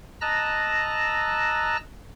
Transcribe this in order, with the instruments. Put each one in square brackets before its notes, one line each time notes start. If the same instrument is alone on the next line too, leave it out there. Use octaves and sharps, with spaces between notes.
[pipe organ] D#5 A5 A#5 E6 F#6 A#6